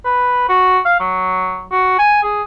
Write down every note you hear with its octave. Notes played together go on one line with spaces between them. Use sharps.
B4
F#4
F5
F#3
F#4
G#5
G#4